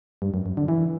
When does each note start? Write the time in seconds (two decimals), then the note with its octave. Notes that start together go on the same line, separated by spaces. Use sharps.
0.22 G2
0.34 F#2
0.46 F#2
0.57 D3
0.68 E3